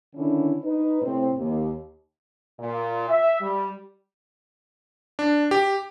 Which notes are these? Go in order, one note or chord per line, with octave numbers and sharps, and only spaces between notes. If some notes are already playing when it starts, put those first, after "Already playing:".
D3 D#3 C#4 D4 E4
D#4 B4
A2 C3 C4
D#2
A#2
E5
G3
D4
G4